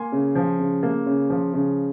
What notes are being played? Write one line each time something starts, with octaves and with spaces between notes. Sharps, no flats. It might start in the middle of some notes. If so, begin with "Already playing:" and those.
Already playing: A#3 G#5 C6
C#3
F3
C#3
A#3
C#3
F3
C#3